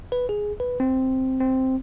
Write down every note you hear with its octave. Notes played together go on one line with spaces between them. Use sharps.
B4
G#4
B4
C4
C4